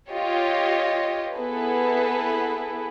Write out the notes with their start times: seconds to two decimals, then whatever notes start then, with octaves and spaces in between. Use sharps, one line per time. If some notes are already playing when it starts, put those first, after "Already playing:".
0.12 F4 G4 C#5 D#5
1.34 B3 E4 G#4 A4 B4